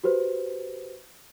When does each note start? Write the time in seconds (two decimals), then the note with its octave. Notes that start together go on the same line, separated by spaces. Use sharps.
0.04 F#4 G4 B4 C5